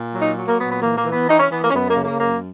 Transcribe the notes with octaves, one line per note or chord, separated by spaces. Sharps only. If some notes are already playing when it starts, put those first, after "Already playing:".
Already playing: A#2
F#3
D#4
F#3
A#3
A#2 B3
B3
E3 A#3
A#3
E3
B3
E3 D#4
C#4
E3 B3
A#3
C#4
F#2 B3
A#3
C#3
A#3
F#2 A#3